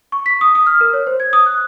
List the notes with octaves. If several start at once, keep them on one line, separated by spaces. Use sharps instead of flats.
C#6
B6
D#6
D#6
F6
A#4
C#5
C5
G#6
D#6
F#6